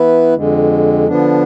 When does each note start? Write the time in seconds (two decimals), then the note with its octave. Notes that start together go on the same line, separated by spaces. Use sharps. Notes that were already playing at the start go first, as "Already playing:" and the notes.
Already playing: E3 B3 E4 B4
0.35 F2 D3 G#3
1.07 D3 F3 B3 D4